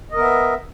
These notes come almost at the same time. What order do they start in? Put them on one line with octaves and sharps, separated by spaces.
D#5 A#4 B3 E5